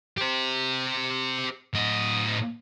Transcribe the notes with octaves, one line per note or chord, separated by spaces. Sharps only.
G4 C5
A2 D#5